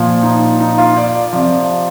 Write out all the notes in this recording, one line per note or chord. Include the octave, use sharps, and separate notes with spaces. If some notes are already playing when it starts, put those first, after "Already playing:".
Already playing: A#2 F3
D#4
D#4
F4
D5
D5
C3 F3